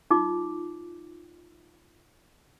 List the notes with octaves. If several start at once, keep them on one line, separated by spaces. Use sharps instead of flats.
D#4 F4 D6